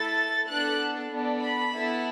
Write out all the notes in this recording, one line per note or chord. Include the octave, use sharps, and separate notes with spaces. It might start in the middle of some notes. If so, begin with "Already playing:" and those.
Already playing: A3 E4 A4 A6
B3 D4 A4 F#6
B3 D4 A4
B5
B3 E4 A4